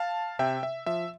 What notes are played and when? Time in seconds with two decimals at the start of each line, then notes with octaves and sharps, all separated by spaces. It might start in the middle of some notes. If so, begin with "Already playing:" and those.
Already playing: F5 A5
0.39 C3 E5 G5
0.63 E5
0.86 F3 E5